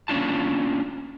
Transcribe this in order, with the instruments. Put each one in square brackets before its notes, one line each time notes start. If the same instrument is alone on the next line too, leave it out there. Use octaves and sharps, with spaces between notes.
[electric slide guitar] A#3 C#4 D4 F4 A5